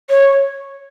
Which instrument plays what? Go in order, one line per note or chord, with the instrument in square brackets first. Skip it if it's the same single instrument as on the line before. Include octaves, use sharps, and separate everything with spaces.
[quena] C#5